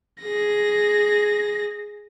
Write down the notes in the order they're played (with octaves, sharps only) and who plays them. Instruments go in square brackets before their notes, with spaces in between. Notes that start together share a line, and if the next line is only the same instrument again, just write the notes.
[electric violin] G#4 A#6